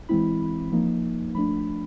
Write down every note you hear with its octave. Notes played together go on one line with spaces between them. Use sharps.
E3 G#3 C4 E4 B5
F3 A#3 D#4
F3 A3 D4 B5